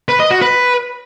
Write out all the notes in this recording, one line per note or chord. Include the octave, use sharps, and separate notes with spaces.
B4
D#5
F#4
B4